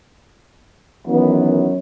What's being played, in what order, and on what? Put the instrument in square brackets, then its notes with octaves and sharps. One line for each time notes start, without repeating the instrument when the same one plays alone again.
[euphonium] F#2 [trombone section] D#3 E3 B3